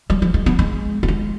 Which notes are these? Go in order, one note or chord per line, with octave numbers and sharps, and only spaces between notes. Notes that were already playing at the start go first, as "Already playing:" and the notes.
G3
F3
G#3
B3
G#3
B3
G#3